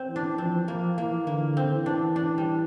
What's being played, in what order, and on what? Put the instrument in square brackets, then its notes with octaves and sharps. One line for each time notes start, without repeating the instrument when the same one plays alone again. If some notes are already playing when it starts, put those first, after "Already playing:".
Already playing: [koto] C4
[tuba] E3
[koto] D4
[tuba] F3 [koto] C4
[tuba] F3 [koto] A#3
[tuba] E3 [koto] A#3
[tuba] D3 [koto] A#3
[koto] C4
[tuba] E3
[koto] D4
D4
G3